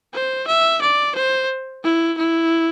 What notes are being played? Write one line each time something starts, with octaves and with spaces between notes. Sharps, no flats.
C5
E5
D5
C5
E4
E4